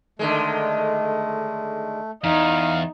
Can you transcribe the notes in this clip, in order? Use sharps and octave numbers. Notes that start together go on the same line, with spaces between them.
D3 D#3 G#3 A3
E2 D#4 F5